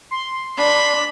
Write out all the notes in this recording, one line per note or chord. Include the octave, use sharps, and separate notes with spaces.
C6
D4 B5